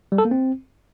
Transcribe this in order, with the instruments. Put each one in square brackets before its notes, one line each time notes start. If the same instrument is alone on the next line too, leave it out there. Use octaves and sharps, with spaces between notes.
[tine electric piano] G3
A4
A#3
C4